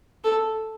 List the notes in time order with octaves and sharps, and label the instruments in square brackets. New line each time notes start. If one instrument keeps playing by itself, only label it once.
[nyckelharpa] A4